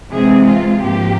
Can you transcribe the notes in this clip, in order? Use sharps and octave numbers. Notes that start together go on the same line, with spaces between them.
C3 E3 G#3 C4 G#4
F4
G#2 F3 A#3 G4